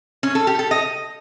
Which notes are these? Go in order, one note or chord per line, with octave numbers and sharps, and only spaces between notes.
C#4
A4
G4
A4
D#5